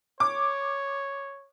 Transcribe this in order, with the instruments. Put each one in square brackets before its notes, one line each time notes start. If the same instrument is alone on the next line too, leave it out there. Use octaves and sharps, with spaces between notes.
[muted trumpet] C#5 [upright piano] D6